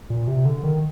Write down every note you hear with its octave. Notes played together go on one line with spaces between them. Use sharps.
A#2
C3
D3
D#3